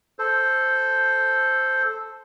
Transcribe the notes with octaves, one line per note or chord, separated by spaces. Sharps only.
A4 C5